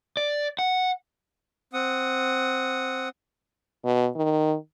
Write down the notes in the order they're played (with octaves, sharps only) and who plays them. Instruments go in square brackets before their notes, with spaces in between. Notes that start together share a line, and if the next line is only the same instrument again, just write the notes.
[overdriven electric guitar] D5
F#5
[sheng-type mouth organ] C4 F#5 D#6
[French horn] B2
D#3